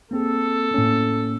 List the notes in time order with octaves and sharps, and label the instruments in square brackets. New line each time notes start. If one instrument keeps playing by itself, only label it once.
[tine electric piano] A#3 C4 G#4 [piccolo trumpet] A4
[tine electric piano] A2 A#3 C#4